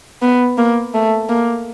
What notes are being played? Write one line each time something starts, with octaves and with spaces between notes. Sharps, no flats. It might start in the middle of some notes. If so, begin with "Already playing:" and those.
B3
A#3
A3
A#3